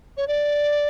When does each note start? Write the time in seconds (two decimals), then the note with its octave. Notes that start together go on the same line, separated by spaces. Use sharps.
0.17 C#5
0.28 D5